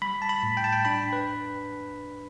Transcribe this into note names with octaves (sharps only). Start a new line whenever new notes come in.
G3 B5
A5
B5
A2
G5
A5
G5
D4 B5
B4